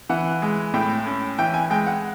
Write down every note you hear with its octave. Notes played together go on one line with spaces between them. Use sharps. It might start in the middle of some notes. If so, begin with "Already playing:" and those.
E3 F#5
G#3
A2 G5
C#4
E3 G5
G#5
G#3 G5
F#5